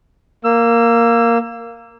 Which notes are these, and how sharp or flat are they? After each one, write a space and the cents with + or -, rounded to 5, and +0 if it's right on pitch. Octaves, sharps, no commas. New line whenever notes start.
A#3 +0 E6 +25